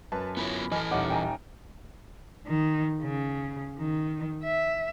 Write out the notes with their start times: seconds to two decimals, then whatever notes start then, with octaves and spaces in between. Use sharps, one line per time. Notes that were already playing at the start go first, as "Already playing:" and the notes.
0.12 F#2 B4 A5
0.37 B3 E4 F4 C#5 B5
0.72 E3 A4 D#5 G#5 B5 F6
0.91 D#1 D#4 C#5 D#5 F#5 D6
1.10 G5 G#5 A#5
2.47 D#3
3.02 C#3
3.78 D#3
4.43 E5